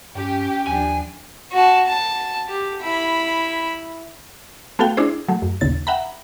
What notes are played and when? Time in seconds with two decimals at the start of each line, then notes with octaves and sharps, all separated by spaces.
0.15 G2 C#4 G4 G5
0.67 D#2 F3 D4 G#5
1.52 F#4 A5
1.87 A5
2.48 G4
2.82 E4 B5
4.79 A3 B3 F#4 A4 F5 G5
4.97 D4 E4 G#4 C5
5.28 F#3 A3
5.42 F#2
5.61 A#1 D#2 C#3 A6
5.87 E5 F#5 G5 A#5 B5